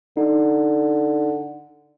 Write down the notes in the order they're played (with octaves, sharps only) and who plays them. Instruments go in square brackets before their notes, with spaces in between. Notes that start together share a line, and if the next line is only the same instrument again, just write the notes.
[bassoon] D3 [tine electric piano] D#4